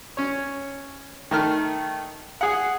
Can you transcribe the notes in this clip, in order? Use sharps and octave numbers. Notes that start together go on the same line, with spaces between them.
C#4 C#5
D#3 A3 F6
G#4 F#5